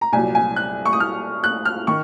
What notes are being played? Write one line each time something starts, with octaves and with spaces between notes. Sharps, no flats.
A#5
C2 A#2 F#3 G#5
G#5
F#6
C#6
D#6
F6
F#6
F6
D#3 C#6